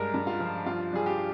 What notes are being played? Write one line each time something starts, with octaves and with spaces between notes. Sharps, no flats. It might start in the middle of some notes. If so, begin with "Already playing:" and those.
Already playing: G2 G#3 A#4
G2
F4
F3
G2 F4
G3 G#4
G4